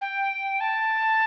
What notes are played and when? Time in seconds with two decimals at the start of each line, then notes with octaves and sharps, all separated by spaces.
0.01 G5
0.61 A5